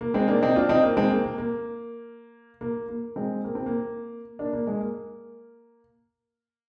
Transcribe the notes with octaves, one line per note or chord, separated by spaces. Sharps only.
A#3
G#3 C4
A#3 D4
C4 D#4
D4 F4
C4 D#4
A#3
G#3 C4
A#3
A#3
A#3
A#3
A#3
G#3 C4
A#3
C4
A#3
A#3 D4
A#3
G#3
A#3